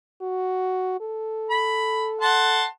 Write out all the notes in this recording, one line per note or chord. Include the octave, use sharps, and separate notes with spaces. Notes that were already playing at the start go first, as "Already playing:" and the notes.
F#4
A4
B5
F#5 A5 C6